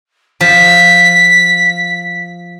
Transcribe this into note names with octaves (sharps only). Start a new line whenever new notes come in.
F3 B6